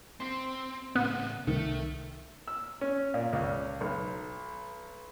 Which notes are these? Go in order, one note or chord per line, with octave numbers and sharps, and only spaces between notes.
C4 C6 C7
A2 C#3 B3
C2 D#3 A3
E6
C#4
A#2
C#2
B1